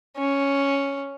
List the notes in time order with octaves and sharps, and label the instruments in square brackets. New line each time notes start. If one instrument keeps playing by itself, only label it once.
[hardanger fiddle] C#4